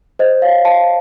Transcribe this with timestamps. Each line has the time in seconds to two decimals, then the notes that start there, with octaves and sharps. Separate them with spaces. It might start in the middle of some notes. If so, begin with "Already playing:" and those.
0.19 C5 D#5
0.42 C#5 F5
0.65 F5 A5